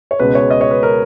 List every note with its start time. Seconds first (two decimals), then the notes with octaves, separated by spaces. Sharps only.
0.11 C#5
0.20 C#2 B2 G#3 B4
0.35 C#5
0.51 D#5
0.61 C#5
0.71 B4
0.83 A#4